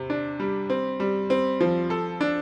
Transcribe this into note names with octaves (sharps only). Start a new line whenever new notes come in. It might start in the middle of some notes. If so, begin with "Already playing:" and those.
Already playing: C3
D4
G3
C4
G3
C4
F3
A4
D4